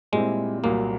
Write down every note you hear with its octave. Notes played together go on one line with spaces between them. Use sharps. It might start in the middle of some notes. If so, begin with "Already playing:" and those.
A#2 G3 G#3 C4 E4
C2 A#2 F#3 A#3